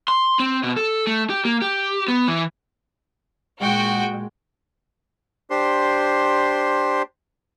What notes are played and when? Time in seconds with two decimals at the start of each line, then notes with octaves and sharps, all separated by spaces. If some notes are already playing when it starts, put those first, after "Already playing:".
0.08 C6
0.39 C4
0.63 B2
0.77 A4
1.07 A3
1.30 G4
1.45 A#3
1.62 G4
2.08 B3
2.28 E3
3.60 A#2 G#3 F#4 G5
5.50 D4 G4 C5 C6